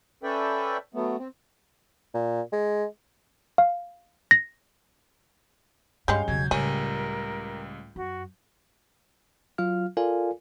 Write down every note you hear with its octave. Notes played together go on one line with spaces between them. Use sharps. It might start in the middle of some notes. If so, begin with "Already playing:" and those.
C#4 A4 B4 D5 E5 G5
F#3 A3 B3
C4
A#2
G#3
F5
A#6
G2 G3 G#3 C#4 F5 G6
E1 C#3 F#3 G#6
C#2 A2 C#3 G3 C#4 A#4 D#7
F#2 F#4
F#3 F4 F5 F6
F4 A4 A#4 D5 F5 G#5